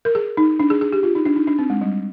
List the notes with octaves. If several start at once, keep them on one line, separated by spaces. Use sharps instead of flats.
A#4
G#4
D#4
D4
G#4
G#4
G4
F4
D#4
D4
D#4
D4
C4
G#3
G3